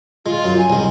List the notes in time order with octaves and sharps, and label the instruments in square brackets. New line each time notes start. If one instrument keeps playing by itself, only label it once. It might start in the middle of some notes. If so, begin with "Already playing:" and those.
[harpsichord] G#3 [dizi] F4
[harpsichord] F#2
[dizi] G#5
[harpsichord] C2 G#3